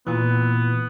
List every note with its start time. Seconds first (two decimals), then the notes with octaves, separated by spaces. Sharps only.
0.07 A#2 E3 B3